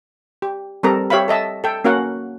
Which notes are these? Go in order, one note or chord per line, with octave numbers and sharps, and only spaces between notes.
G4
G3 C4 A4 A#4 A#5
G4 C#5 E5 F5 B5
A4 D#5 E5 A5
A4 G5
A#3 C#4 F#4 A#4 F5 F#5